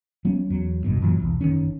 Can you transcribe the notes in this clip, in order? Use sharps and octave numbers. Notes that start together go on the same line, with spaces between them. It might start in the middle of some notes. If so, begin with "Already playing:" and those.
F#3 B3 C#4
E2 F#3
F#1 C2 G2 B2
F#2 A#2 E3 F#3
B1 E2
F#1 C#2 D#3 C#4